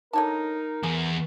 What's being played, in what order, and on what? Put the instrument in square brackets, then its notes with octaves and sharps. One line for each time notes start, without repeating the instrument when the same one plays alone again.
[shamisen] D3 C#5 A5 [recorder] D#4 [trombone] A#4
[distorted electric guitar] E2 [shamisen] G#4